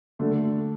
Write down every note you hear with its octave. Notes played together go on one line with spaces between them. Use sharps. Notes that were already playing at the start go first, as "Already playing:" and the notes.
D3 A3 D4 F#4